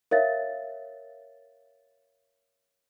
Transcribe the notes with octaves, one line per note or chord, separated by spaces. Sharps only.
A#4 C#5 E5 F5 A6